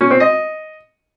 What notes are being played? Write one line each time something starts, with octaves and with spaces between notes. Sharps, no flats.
C#4
C4
D#5